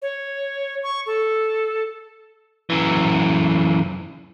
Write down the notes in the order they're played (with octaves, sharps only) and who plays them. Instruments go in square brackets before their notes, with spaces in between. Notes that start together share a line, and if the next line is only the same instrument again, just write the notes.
[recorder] C#5
C#6
A4
[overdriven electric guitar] F#2 E3